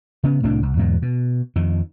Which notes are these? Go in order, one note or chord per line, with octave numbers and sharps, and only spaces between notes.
C#3 B3
C2 A2 C4 D4
C2
E2 G#2 B2 F#3
B2
F2 D#3